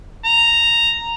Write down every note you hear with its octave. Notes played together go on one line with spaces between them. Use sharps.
A#5